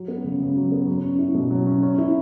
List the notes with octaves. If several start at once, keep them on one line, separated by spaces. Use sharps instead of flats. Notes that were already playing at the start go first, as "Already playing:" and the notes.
Already playing: F#3 F#4
B3
C#3
C#3
F#3
B3
F#3
C#4
E4
B2
F#3
C#4
C#4
E4